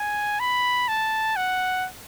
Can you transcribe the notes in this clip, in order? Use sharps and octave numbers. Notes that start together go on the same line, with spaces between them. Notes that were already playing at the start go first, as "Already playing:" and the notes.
Already playing: G#5
B5
A5
F#5